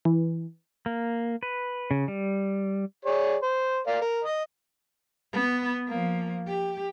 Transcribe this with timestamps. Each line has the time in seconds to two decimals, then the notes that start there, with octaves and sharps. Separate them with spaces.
0.05 E3
0.86 A#3
1.43 B4
1.91 C#3
2.08 G3
3.05 G#4 C#5 D5
3.42 C5
3.87 A#4 D5 F5
4.01 A#4
4.24 D#5
5.33 B3
5.88 F3 A#3
6.48 G4